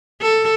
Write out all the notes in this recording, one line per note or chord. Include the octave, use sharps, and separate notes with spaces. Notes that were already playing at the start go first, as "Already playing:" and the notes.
A4